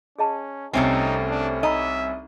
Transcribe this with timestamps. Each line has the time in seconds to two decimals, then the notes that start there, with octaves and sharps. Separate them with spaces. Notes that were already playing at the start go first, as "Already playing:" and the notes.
0.19 C#4 G#4 D#5 A5
0.73 C2 C3 A3 C4 C#4 D#4
1.30 D4
1.63 D#4 D#5 E5 A#5 B5